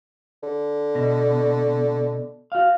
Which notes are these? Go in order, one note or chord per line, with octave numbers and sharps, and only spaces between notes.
D3
B2
F#4 F5